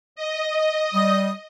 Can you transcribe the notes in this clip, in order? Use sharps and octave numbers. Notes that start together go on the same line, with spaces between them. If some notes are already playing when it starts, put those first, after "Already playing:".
D#5
G3 D#6